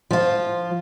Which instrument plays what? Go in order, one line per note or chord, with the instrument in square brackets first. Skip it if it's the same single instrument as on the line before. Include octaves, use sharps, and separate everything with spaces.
[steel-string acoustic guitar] F3 F4